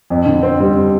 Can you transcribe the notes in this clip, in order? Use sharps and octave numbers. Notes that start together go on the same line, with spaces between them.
F2
D3
C4
G3